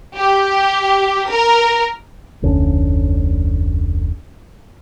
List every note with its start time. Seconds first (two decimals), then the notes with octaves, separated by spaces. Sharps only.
0.17 G4
1.30 A#4
2.42 F1 D2 D3 C#4